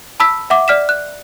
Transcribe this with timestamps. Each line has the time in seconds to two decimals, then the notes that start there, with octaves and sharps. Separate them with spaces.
0.20 A5 B5 E6 B6
0.50 E5 F#5 D6
0.68 D5 F6 B6 E7
0.89 F#6